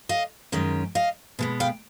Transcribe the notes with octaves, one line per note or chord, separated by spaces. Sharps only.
D#5 F5
F#2 D#3 G#3 C#4
D#5 F5
B2 G#3 B3
F5 G5